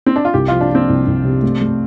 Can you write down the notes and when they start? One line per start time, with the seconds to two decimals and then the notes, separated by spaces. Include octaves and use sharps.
0.06 C4
0.16 D4
0.25 F4
0.34 C2 G4
0.48 F3 F4
0.61 D4
0.70 F3 C4
0.89 C2
1.07 C2
1.24 C3
1.43 A3
1.61 A3